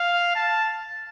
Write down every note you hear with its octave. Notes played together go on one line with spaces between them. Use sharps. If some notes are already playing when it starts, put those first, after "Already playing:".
Already playing: F5
A5